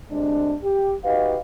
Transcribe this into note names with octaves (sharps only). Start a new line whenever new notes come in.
D2 C3 G#3 D4
G4
D#4 F#4 G4 B4 D#5 F5